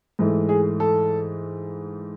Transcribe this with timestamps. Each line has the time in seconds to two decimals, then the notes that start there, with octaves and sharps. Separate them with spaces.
0.19 G#2 E3 A3
0.49 G#4
0.80 A4